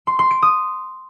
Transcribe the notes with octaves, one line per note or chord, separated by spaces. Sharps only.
C6
C6
D7
D#6